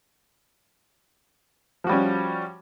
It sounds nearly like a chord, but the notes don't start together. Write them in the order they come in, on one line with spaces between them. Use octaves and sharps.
F3 F#4 G3 C#4